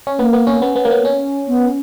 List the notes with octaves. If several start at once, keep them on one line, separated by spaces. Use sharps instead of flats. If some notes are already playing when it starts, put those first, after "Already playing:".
C#4
A#3 B3
B3
C#4
B3
B3
A#3
B3
C#4
B3